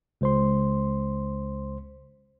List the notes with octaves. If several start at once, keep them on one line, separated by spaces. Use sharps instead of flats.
C#2 C5 C6